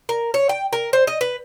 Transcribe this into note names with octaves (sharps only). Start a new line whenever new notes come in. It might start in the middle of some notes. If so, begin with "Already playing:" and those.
A#4
C#5
G5
A#4
C5
D#5
B4